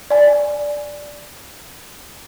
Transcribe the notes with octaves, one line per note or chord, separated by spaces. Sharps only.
D5 G#5